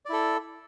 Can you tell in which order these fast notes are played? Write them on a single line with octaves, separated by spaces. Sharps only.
D5 E4 A4